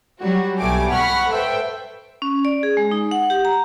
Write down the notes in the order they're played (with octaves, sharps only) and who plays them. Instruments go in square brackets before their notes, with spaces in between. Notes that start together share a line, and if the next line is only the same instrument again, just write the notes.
[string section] F#3 G3 F#4
B1 G3 A3 G#5 D6
F#5 B5 C#6 F6 B6
A4 B4 C5 E5 G5
[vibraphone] C#4
D5
G#4
G#3
D#4
F#5
G4
A#5